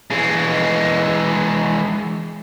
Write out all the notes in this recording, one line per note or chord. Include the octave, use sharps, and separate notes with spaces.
E3 G#3